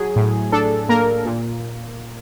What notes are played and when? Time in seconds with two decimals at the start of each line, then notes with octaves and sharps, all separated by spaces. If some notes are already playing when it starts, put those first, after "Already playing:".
Already playing: F#3 G#4
0.16 A2
0.52 D4 A4
0.89 A#3 A#4
1.25 A#2